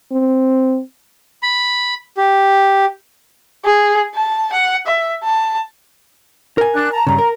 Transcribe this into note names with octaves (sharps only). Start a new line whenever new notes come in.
C4
B5
G4
G#4
A5
F#5
E5
A5
A#4 G#5
D4 F#6
A5 A#5
G2 C#3 A#5
A#4